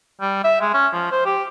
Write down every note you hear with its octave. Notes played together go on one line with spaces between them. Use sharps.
G3
E5
G#3
C#4
F3
C5
G4